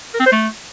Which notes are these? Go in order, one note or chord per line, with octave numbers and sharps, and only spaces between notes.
A#4
C4
C5
A3